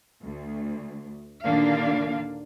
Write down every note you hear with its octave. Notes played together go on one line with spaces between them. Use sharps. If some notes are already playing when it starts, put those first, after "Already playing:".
D2
D#2 A#2 D3 A#3 D4 F5